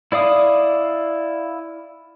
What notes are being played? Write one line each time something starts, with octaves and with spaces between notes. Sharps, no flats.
E4 D5 F5 D#6